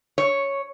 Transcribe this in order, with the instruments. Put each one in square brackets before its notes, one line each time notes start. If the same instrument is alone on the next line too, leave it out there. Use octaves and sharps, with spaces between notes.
[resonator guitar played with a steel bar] C#5